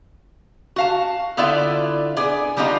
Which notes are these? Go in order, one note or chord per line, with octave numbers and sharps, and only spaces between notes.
F#4 F5 A5
D3 B3 E4 F4 D5 E5
B3 D4 G#4 D5
F3 G3 B3 D4 D#4 F4